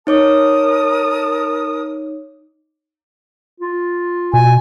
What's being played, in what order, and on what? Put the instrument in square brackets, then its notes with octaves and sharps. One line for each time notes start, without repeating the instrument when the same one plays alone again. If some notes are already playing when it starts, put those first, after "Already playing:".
[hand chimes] D#4 C#5 D6 [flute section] A#4 A5 D#6
[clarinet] F4
[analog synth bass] B2 [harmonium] G#5